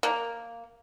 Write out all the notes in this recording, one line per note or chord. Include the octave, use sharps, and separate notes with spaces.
A#3